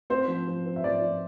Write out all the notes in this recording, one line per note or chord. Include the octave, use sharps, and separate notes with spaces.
C4 C5
F3
F3
C4
E5
F3 D5
F3